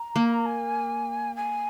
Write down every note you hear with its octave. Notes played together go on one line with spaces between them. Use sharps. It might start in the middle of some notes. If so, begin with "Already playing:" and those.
Already playing: A#5
A#3
G#5
G#5